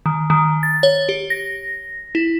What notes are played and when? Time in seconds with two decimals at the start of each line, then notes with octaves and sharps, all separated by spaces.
0.06 D#3
0.30 D#3
0.63 A6
0.83 C#5
1.09 G4
1.30 A#6
2.15 E4